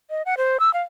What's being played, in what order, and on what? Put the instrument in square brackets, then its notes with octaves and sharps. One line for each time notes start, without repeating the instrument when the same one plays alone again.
[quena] D#5
F#5
C5
E6
F5